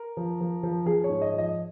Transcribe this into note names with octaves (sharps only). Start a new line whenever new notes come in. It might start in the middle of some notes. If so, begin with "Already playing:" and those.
Already playing: A#4
F3
F3
F3
F3 G#4
C#5
G#2
D#5
F3 D#5